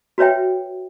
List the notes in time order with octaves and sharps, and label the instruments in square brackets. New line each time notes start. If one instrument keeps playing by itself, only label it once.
[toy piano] F#4 B4 C#5 E5 G5